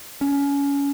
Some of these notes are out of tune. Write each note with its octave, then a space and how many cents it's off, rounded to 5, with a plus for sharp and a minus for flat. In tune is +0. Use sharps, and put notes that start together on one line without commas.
C#4 +25